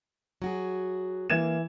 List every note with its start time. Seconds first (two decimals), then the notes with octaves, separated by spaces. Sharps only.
0.42 F#3 F#4 G#4
1.30 E3 A#3 G#6 E7